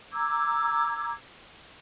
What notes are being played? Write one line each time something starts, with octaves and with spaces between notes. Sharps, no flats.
A#5 D6 E6 G#6